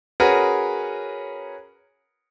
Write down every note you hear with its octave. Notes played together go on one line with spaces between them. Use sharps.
C#4 F#4 G#4 A#4 B4